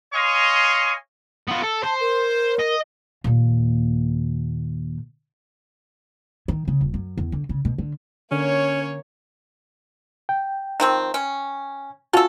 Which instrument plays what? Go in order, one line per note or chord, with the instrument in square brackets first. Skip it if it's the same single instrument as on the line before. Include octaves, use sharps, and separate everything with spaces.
[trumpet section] C#5 D#5 F5 G#5 C6 C#6
[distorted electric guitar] B3 F4
A4
[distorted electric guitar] C5 [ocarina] A5
[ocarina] A#4
[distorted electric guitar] D#5
[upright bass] D#2 A#2
D#3
C#3
D#1
F#2
E2
D3
C#3
B2
D3
[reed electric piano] D3 [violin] A#3 C#5 [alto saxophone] C#4
[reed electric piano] G5
[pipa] D#3 F3 C4
C#4
[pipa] C#4 A4 [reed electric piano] F4 F#4 A5